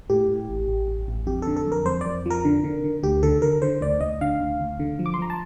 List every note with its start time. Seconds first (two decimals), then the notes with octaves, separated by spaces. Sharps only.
0.10 A2 G4
0.29 A2
0.49 A1
0.68 A1
0.88 A1
1.08 A1
1.27 F2 G4
1.42 D3 A4
1.56 A4
1.66 F2
1.72 A#4
1.85 F2 C5
2.01 F2 D5
2.26 F3 A#4
2.45 D3
2.64 D3
2.84 D3
3.03 D2 G4
3.23 D3 A4
3.42 D3 A#4
3.62 D3 C5
3.81 D2 D5
4.01 D2 D#5
4.21 D3 F5
4.40 D2
4.60 D2
4.80 D3
4.99 F3
5.06 D6
5.14 C6
5.19 F3 A#5
5.30 A5